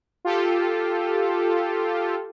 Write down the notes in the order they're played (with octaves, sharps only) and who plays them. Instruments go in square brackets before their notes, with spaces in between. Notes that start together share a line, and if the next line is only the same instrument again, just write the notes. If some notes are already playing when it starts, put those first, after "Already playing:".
[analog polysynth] F4 G4 A4